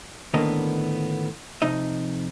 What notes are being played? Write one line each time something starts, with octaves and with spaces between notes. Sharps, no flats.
A2 D3 D#3 A#3 B3 D#5
F2 C3 D#4 D#5